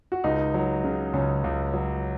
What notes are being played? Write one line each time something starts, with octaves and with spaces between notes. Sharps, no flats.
F#4
C#2 D#4
F#3
C#3
C#2 C#4
C#2
F#3